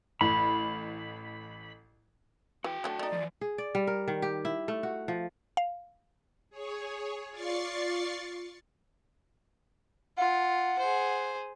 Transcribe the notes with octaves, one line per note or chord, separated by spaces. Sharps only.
A1 B5
E3 F#4 G5
F#3 A3 D4
A3 D#4 D5
E3 F3
G#4
D5
G3
A#4
D#3
G4
E4
A3
F#4
F3
F5
G#4 C#5
F4 D5 C#6 A6 C7
F4 F#5
G#4 C5